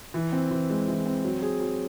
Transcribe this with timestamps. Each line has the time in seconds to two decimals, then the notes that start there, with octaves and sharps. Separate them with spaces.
0.14 E3
0.32 C4
0.51 E3
0.70 G#3
0.88 E3
1.06 C4
1.24 F#3
1.42 G#4
1.61 F#3